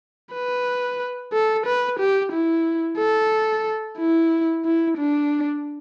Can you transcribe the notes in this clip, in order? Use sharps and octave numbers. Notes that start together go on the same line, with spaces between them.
B4
A4
B4
G4
E4
A4
E4
E4
D4